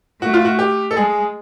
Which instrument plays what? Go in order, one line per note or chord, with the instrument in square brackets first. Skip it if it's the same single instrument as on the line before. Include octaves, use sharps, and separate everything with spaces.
[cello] A3 [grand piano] F#4
[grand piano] F4
F#4
G4
A4
[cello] G#3 [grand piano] G#4